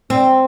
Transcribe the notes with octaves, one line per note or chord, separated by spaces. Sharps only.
C4